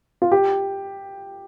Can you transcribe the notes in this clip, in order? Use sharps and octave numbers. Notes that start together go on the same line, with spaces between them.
F4
G4